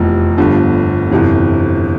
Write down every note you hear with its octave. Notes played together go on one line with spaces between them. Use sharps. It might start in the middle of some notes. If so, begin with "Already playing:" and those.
Already playing: F1 E2 C3 F3
G1 G2 D3 F3 B3
G1 F2 C3 E3